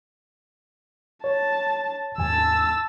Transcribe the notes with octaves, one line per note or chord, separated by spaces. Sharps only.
C#5 A5
D#2 G#2 G#5 A5 E6